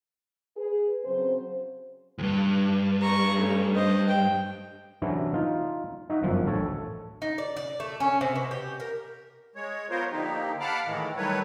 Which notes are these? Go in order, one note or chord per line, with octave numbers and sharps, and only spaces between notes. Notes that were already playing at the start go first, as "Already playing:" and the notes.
G#4 B4
C#3 F#3 C4 C5
D2 G2
A#5 C#6
A3 C#4
C5 D#5
G5
C3 E3 F#3 C#4 D4 E4
D#4 F4 F5
D#4 F#4 E5
G1 F#2 F3 F#5
A1 D2 A4 C#5
D#4
D5
D5
A3
C#4
C3
B2
G4
A#4
G#3 C#5
F#3 B3 F4 A#4 C5 C#5
D3 F3 A#3 D#4 G4
F5 F#5 A5 B5 D6 F6
A2 D#3 E3 G#3
D#3 F#3 G3 A3 B4 C#5